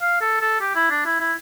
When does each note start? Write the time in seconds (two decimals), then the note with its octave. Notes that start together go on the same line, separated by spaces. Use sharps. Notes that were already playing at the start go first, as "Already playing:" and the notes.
0.01 F5
0.21 A4
0.41 A4
0.61 G4
0.75 E4
0.90 D4
1.05 E4
1.20 E4